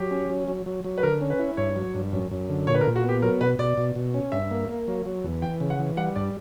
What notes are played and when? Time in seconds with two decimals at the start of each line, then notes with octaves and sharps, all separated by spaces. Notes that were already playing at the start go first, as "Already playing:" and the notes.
Already playing: F#3 G4
0.11 C#4
0.30 F#3
0.48 F#3
0.66 F#3
0.84 F#3
0.98 B4
1.03 D3 A#4
1.21 C#4
1.30 B4
1.39 E4
1.57 G2 C#5
1.76 F#3
1.94 G2
2.13 F#2
2.31 F#2
2.49 D3
2.67 A#2 C#5
2.74 B4
2.81 A#4
2.86 A#2
2.96 F#4
3.04 B3 G4
3.22 F#3 A#4
3.41 B2 B4
3.59 B2 D5
3.77 B2
3.95 B2
4.14 C#4
4.32 G2 E5
4.51 A#3
4.69 A#3
4.88 F#3
5.05 F#3
5.24 E2
5.42 E3 G5
5.60 C#3
5.70 F#5
5.79 E3
5.97 G3 F#5
6.16 G2 D5